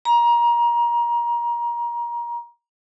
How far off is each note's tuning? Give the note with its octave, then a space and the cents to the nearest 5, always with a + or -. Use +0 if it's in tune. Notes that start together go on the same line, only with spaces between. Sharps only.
A#5 +25